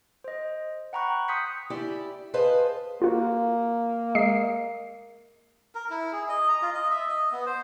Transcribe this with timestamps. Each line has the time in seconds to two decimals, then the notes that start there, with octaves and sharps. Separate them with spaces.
0.24 C5 D#5
0.93 F#5 G5 A#5 B5 C#6 F#6
1.28 C6 D#6 G6 B6 C#7
1.70 E4 G4 G#4 D5
2.34 G#4 B4 C5 D#5 F5 A5
3.02 A#3 F4 F#4
4.15 G#3 D#5 C7
5.75 A#4
5.90 E4
6.12 G#4
6.29 D#5
6.49 A#5
6.62 F4
6.74 D#5
6.90 E5
7.09 D#5
7.32 B3
7.46 C5